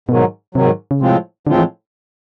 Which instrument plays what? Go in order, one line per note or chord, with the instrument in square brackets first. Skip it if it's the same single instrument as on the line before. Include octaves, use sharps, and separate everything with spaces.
[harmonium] G#2 D#3 F#3 [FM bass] B2
[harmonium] G#2 D#3 F#3 [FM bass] C3
[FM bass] C#3
[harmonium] A2 F3 G#3 C4 F4 [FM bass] C3
[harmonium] A2 F3 G#3 C4 F4 [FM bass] D3
[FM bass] E3